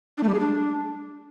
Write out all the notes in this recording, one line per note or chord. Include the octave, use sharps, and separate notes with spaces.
D4
A3
G3
G#4
D4